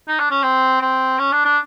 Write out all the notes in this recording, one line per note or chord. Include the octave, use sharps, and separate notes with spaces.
D#4
D4
C#4
C4
C4
C#4
D4
D4